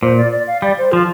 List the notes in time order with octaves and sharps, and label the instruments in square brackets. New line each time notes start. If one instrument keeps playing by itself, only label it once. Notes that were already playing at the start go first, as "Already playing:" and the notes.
[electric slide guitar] A#2 [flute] C5
[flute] D5
D5
F5
[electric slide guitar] G3 [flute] D5
[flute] C5
[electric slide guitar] F3 [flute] F4